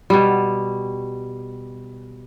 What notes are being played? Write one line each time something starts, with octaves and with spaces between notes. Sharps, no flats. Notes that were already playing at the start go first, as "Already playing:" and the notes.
B2 G3